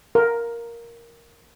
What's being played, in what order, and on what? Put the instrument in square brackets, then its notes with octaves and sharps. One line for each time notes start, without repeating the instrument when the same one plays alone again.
[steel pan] A#4